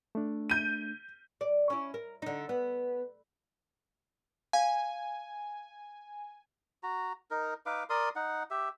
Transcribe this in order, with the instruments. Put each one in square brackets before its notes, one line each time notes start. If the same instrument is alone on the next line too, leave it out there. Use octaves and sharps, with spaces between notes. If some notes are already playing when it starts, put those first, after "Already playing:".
[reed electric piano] A3 D4
[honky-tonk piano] G6 D#7
[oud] D5
C#4 E4
A#4
D3 D#4
B3
[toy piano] F5 [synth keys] G#5
[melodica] F#4 A#5
D#4 A#4
D#4 B4 F5 D6
A#4 D5 C6 D#6
D#4 F#5
G4 E5